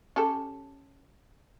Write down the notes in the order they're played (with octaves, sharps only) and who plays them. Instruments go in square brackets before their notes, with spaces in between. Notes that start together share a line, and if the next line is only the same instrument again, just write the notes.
[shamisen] C#4 G4 A4